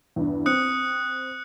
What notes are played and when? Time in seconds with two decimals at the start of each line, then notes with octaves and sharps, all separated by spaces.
0.16 E2 G2
0.46 C4 D#6 F#6 C#7